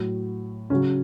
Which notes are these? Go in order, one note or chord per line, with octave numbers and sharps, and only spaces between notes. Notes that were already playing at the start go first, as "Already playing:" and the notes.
Already playing: A2 F#3
C#3 F#3 C#4